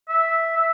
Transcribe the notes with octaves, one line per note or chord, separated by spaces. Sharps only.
E5
E5